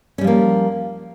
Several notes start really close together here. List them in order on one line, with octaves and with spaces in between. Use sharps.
C#4 G3 F3 A#3